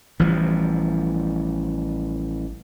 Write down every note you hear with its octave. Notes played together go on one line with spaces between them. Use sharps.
A1 E3 F3 G3